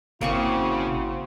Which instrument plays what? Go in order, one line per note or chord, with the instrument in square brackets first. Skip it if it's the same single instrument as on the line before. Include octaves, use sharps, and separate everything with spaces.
[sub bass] G#1 [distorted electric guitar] C#3 [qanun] A#3 C4 C#6 [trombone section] E4 F#4 C5